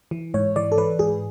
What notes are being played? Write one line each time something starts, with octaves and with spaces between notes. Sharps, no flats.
E3
G#2 C#5
E3 D5
A4
E3 B4
G#2 G#4